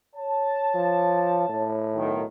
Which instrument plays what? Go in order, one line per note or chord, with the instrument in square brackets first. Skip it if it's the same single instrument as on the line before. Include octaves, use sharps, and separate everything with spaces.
[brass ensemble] C#5 A5
[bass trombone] F3
A2
[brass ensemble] B1 D#3